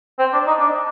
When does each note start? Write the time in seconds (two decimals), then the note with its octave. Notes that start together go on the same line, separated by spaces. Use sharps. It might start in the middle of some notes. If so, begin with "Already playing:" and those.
0.19 C4
0.33 D4
0.47 D#4
0.60 D4